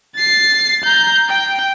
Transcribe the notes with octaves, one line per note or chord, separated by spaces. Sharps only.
A6 C7
A#5 G6
G5